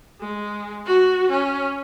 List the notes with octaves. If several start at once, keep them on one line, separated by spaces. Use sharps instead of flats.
G#3
F#4
C#4